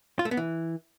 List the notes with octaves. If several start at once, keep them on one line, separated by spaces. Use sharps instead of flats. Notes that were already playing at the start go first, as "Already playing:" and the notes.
F4
A3
B3
E3